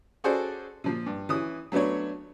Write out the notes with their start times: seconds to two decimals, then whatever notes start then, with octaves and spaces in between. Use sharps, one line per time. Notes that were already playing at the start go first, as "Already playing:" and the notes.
0.24 C#4 F#4 G#4 A4 C5 D5
0.84 A#2 F3
1.06 G2
1.29 E3 C#4 D#6
1.72 F#3 A3 B3 D4 C#5